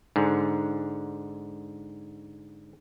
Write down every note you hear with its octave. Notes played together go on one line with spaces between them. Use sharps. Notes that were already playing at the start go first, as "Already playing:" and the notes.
G#2 D3